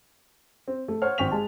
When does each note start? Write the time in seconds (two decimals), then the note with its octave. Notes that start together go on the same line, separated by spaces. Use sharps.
0.68 C4
0.88 A3
1.02 C5 C#5 F#5 F6
1.18 G#1 C4 G5 C#6 B6 F7
1.31 G#3 A5